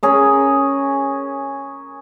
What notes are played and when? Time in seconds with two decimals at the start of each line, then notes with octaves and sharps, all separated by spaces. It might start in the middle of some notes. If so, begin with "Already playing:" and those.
0.03 C#4 G#4 A#4